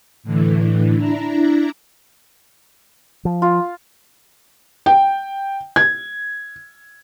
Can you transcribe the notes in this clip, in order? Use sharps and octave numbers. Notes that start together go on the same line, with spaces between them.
A2 D3 E3
D4 E4 A#5
F3
F4
G5
G#6